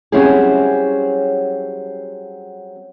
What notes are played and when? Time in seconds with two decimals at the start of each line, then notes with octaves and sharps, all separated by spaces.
0.12 F#3 G3 C4 C#4 E4 G#4